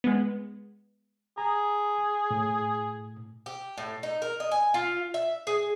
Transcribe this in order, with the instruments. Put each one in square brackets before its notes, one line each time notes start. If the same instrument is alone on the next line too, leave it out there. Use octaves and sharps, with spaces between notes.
[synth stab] G#3 B3
[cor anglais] G#4 [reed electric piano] A#5
[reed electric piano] A2
[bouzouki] G4
A2
D#4
A#4
D#5
G#5
F4
E5
G#4